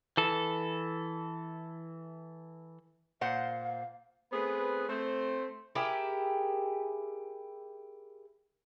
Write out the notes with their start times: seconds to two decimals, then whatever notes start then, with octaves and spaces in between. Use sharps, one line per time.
0.17 E3 A4
3.21 A#2 C5 F5 F#5
4.32 A3 B3 C4 G#4 B4
4.89 A3 C4 C5
5.75 E4 G4 G#4 A#4